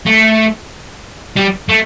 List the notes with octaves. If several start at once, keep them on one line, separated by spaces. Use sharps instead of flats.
A3
G3
A3